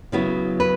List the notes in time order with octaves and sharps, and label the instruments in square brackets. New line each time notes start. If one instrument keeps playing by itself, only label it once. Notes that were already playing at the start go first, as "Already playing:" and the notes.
[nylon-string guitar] C#3 F#3 B3 E4
B4